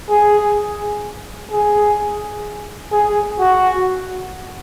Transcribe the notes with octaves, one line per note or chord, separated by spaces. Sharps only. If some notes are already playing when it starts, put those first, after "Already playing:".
G#4
G#4
G#4
F#4